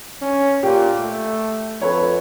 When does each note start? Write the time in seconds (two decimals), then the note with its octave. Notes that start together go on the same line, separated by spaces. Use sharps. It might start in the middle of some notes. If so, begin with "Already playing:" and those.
0.22 C#4
0.63 A#2 G4
1.00 A3
1.82 F2 A4 B4 C#5